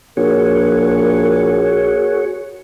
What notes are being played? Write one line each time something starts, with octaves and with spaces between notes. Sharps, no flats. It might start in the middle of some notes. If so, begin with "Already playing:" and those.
A#1 F#4 G#4 A#4 C#5